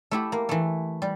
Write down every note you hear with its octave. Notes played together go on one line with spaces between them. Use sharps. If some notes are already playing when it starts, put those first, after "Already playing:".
A3 E4 G4
A#3
E3 A3
G3